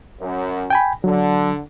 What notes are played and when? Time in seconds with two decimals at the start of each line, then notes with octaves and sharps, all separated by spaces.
0.21 F#2
0.70 G5 G#5 B5
1.04 D3 F#3